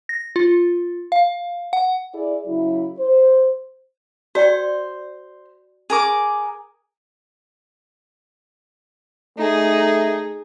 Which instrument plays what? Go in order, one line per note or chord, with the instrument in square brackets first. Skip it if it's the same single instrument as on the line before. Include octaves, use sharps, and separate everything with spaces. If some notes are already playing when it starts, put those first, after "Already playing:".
[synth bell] A#6
F4
F5
F#5
[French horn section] E4 G#4 D5
C#3 F#3 E4
C5
[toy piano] F#4 D5 G5 [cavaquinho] C5
[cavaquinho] G#4 A#4 D6
[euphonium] A3 [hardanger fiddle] D#4 G#4